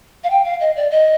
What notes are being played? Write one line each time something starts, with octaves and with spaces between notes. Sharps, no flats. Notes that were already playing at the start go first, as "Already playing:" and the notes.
F5
G5
F5
D#5
D5
D#5